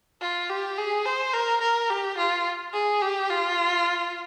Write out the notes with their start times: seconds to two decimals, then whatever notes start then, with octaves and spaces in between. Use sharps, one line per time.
0.21 F4
0.49 G4
0.78 G#4
1.05 C5
1.33 A#4
1.61 A#4
1.90 G4
2.18 F4
2.73 G#4
3.02 G4
3.30 F4